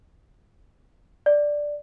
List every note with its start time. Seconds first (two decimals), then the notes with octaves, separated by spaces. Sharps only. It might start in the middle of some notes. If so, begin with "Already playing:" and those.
1.26 D5